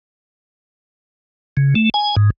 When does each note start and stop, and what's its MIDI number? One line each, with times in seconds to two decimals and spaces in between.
1.57 1.74 49
1.75 1.90 57
1.94 2.15 80
2.16 2.30 44